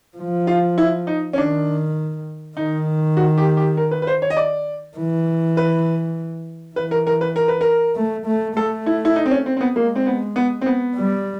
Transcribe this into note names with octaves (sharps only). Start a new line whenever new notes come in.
F3
F4
E4
D#4
C#4
D#3 D4
D#3 D#4
F#4
G4
G4
A#4
B4
B4
C5
C#5
D#5
D5
E3
B4
E3 B4
A#4
A#4
B4
A#4
B4
A#4
A3
A3
A3 A4
E4
E4
D#4
C4
C#4
C4
C4
B3
G#3 A#3
C4
B3
B3
C4
B3
G3